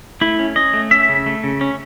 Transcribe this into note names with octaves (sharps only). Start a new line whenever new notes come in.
A3 E4
C#4
C#4 D#5
A3
C#4 E5
C#3
A3
C#3
C#4